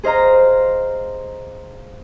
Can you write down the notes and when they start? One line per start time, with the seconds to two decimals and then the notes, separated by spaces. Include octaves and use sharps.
0.03 G#4 C5 D#5 F5 A#5